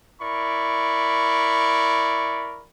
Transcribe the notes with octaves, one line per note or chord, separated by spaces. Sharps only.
E4 A#4 D5 B5 C#6